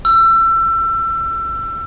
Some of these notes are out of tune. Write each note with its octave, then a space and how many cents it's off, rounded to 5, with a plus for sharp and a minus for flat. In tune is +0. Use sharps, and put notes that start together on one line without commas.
E6 +30